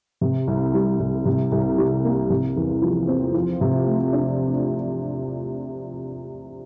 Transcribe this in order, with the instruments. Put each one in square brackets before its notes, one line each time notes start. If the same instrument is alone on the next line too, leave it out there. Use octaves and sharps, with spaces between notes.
[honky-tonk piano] C3
C2
G3
C2
C3
C2
G3
A#3
C3
E2
F3
C4
F3
C3
A3
D4